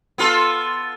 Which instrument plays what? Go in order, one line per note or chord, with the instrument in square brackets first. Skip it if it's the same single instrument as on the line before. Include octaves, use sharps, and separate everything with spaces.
[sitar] B3 F4 A4